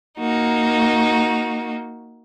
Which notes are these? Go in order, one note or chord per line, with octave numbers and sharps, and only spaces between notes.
A#3 D#4 F#4